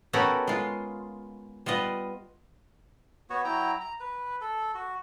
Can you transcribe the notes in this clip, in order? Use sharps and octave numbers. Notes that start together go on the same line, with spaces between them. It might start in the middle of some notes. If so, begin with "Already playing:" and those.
B3 C#4 F#4 G4 A4 A#4
G#3 F4
G3 B3 F4 D#5
B3 F#4 C#5
F#3 E4 G5 A#5
A#5
B4
A4
F#4